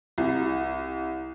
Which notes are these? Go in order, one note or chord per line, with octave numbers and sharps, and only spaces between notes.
C2